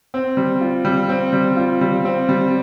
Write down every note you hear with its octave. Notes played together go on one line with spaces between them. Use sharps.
C4
G3
F4
G3
C4
G3
F4
G3
C4
G3